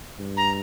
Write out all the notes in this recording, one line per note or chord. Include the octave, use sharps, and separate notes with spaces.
G2
A#5